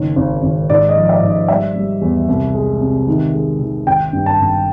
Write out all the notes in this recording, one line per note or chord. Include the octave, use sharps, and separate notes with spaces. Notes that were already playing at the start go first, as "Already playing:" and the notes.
Already playing: F#1 D#3 C#5
G#1
G#1
G#2 D5
D#5
F3
E5
G#2
D#5
G3 E5
G3
E2
C2
G#3
C3
D#3
G#3
D#3
G#1 G5
G2
A5
G#1